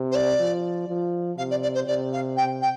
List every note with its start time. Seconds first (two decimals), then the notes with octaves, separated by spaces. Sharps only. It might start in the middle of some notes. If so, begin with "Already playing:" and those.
Already playing: C3
0.11 C5
0.15 D5
0.40 F3
0.88 F3
1.38 C3 F5
1.50 D5
1.62 D5
1.74 C5
1.87 C3 D5
2.12 F5
2.36 G5
2.61 G5